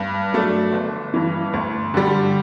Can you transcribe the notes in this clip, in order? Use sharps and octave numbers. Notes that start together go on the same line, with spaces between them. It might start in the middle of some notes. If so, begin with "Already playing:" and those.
Already playing: G2
F#3 A3 D4
G1
G2 E3
D2
D3 G3